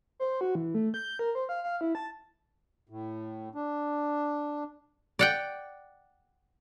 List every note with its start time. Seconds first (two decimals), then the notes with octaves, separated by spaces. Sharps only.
0.20 C5
0.41 F#4
0.55 E3
0.75 A3
0.94 G6
1.19 A#4
1.35 C5
1.49 F5
1.64 F5
1.81 E4
1.95 A5
2.89 A2
3.55 D4
5.19 D5 F#5 G5